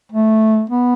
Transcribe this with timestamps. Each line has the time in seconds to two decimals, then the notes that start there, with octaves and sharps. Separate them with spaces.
0.12 A3
0.70 B3